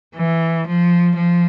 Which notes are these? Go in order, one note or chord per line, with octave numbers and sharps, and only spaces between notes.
E3
F3
F3